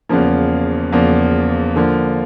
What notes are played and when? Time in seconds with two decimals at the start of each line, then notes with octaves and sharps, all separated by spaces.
0.09 E2 C#3 F3 A#3
0.92 E2 C#3 F3 A#3
1.76 D3 F3 A#3